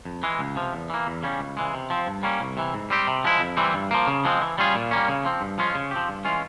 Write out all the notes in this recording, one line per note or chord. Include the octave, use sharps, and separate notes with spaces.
F2
E3 G#3
C#2
C3 F3
E2
E3 A#3
E2
C#3 G3 C#4
C#2
C#3 E3 G#3
C3
F3 C4
G2
G3 A#3 C#4
C2
C3 E3
G#2
G3 C4 G4
C3
F3 G#3 E4
F2
E3 G3 C4
G2
F3 A#3
C#3
F3 G#3 C4
E3
G3 C#4 F4 G#4
A#2
G3 A#3 C#4
C#3
F3 C4
G2
F3 G#3 C#4 F4
C#3
F3 C4 G4
G2
E3 G#3 C#4 F4